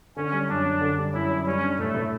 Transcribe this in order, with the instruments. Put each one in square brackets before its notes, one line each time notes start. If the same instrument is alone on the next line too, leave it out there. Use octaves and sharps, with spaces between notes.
[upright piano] D3 [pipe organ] C#4
[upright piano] G3
[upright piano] F#2 [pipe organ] D4
[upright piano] F#2
D3
G3
[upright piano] F#2 [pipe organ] E4
[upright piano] F#2
[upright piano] G3 [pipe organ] C#4
[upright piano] D4
[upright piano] A2 [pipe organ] A3
[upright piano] A2